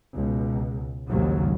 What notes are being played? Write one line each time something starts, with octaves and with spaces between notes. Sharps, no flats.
C#2 B2
A#1 D#2 G#2 C#3 F#3